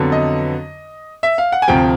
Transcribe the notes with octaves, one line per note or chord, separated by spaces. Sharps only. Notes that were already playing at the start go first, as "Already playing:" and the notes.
Already playing: F2 D3 F#3 B3
D#5
E5
F5
F#5
G#5
D2 C3 F3 G5